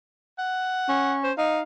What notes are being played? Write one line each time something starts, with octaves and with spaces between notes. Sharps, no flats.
F#5
C#4
C5
D#4 F5